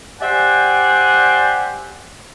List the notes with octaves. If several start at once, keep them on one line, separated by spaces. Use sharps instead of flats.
G4 C5 D5 E5 F#5 G#5